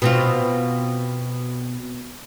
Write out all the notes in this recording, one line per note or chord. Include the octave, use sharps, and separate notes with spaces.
B2 C4 F4